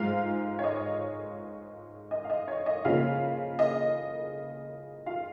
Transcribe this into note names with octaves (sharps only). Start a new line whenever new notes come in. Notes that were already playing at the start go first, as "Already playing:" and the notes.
Already playing: G#2 G#3 F4 F5
C#5
D#5
D#5
F5
D#5
C#5
D#5
C#3 F3 A#3 F4 F5
D#5
F4 F5